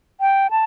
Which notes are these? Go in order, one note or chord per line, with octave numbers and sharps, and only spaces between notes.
G5
A5